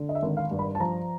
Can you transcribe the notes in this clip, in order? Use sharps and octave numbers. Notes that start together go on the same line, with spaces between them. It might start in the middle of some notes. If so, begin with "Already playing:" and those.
Already playing: D3
D#5
E5
G#1
F5
G2
B5
A5
F3 A#5